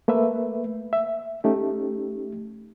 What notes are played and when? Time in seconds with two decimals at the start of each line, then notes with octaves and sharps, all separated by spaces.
0.08 A3 A#3 B4 E5
0.93 E5
1.44 A3 C#4 D#4 G4